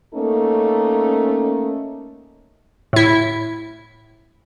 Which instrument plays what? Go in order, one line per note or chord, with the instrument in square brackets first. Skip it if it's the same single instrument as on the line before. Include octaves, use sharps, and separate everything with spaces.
[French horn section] A3 A#3 C#4 D#4 A4
[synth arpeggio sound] A2 E4